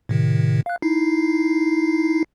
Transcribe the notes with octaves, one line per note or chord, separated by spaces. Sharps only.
A2 C3 D#3
F5 F#6
D#4 E4 C7